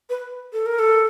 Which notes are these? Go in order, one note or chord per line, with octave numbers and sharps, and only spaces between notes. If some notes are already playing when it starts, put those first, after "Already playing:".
B4
A4
A#4
A4